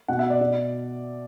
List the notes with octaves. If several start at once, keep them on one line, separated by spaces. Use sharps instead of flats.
B2 F#5
E5
D5
B2